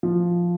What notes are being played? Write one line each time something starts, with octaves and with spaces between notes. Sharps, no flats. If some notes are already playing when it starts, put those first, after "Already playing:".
F3